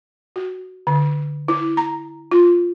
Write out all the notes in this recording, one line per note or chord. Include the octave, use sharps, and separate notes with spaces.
F#4
D3
E4
A#5
F4